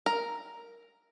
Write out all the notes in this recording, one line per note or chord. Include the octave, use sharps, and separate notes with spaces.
A#4